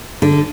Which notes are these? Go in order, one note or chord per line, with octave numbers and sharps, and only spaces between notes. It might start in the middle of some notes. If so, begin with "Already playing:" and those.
D3